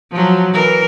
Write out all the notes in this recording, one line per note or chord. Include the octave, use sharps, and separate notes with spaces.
F3 F#3
E3 A#4